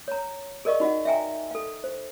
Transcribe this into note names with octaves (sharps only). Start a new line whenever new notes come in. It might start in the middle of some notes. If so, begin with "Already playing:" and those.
C#5 A#5
G#4 A#4 D5 D#5 F5 C#6
D#4 F#4 D#5 F5 F#5
E5 F5 G5 G#5 A#5
A4 F5
C5